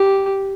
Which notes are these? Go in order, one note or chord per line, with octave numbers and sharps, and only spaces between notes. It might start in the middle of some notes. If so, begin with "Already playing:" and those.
Already playing: G4